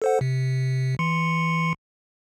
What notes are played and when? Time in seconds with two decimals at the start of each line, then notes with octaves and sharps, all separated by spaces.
0.02 A4 C5 F#5
0.21 C3
0.99 E3 C6 C#7